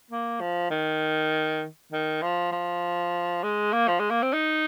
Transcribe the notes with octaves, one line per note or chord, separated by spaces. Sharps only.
A#3
F3
D#3
D#3
F3
F3
G#3
A#3
F3
G#3
A#3
C4
D#4